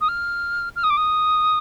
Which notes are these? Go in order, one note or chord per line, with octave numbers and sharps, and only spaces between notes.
D#6
F6
F6
D#6
D6
D#6